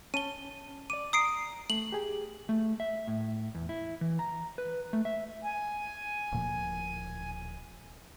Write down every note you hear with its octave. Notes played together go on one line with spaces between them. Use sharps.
C#4 A5 D#7 G7
D5 D6 D#7
A#5 D#6 C7 D7
A3 F#7
G4 G#4
A3
E5
A2
E2
E4
E3
A#5
B4
A3
E5
G#5
D1 A#2 F3